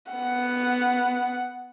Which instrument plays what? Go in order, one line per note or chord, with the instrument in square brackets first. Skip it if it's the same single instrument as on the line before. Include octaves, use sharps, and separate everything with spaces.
[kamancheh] B3 F#5